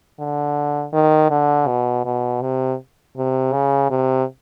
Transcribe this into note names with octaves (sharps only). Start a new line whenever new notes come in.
D3
D#3
D3
B2
B2
C3
C3
C#3
C3